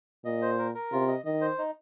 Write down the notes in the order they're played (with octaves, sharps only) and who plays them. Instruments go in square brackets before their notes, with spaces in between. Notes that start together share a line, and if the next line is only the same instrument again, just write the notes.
[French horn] A#2 [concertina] D#5
[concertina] C5
A#4
A#4
[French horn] C3 [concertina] F4
[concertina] D#5
[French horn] D#3 [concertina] D#5
[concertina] C5
D#4